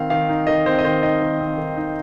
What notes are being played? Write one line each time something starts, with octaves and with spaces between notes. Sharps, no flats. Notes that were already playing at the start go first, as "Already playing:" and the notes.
Already playing: D#3 C4 F5
D#3 F5
D#4
D#3 D#5
C4 C5
D#5
D#3 C5
D#4 D#5
D#3
C4
D#3
D#4